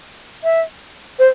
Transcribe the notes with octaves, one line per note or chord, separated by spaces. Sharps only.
E5
C5